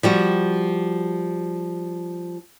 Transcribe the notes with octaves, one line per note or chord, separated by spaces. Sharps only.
F3 G3 F#4